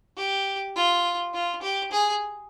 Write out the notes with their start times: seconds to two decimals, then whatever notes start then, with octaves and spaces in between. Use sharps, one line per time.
0.17 G4
0.76 F4
1.34 F4
1.62 G4
1.92 G#4